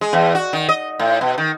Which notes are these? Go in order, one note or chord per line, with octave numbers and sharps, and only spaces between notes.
G#3
E2
F#4
D#3
D#5
A2
B2
D#3